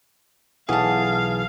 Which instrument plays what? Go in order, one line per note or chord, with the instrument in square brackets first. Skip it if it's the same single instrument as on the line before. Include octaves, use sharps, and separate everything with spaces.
[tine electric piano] B1 E3 G#4 [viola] F5 [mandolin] F#5 A5